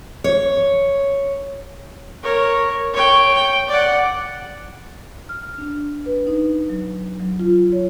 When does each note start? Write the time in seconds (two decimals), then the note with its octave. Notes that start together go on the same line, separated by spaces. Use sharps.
0.24 C#5
2.23 A#4 C#5
2.93 C#5 G5
3.34 G5
3.68 D5 F#5
5.29 F6
5.58 D4
6.06 B4
6.27 D#4
6.69 F#3
7.20 F#3
7.40 F4
7.72 C#5